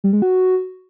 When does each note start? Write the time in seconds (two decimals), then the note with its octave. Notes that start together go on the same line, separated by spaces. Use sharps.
0.04 G3
0.13 G#3
0.22 F#4